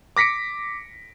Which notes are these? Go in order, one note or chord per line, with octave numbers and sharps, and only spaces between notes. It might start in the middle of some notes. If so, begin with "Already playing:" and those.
D6 A#6 B6 C#7 D7